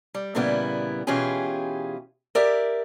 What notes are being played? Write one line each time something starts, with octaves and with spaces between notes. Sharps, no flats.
G3
A#2 C#3 E3 G3 B3 E4
B2 E3 C#4 F4 G4 G#4
G4 A#4 D5 E5